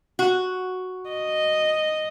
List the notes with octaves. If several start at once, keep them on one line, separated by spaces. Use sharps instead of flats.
F#4
D#5